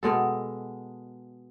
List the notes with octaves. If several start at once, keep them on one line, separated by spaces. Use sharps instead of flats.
B2 G#3 A4